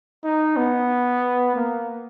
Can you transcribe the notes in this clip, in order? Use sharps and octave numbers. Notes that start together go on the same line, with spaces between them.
D#4
B3
A#3